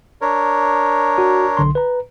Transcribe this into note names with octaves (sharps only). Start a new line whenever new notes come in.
D4 A#4 C#5
F#4
B1 D3 C6
B4 A#5